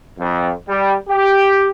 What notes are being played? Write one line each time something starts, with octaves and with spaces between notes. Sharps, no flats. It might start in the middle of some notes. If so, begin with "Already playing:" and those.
F2
G3 G4
G4